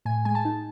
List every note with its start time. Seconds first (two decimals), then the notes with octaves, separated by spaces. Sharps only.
0.05 A2 G#5
0.25 G#3 G#5
0.35 A5
0.45 D#4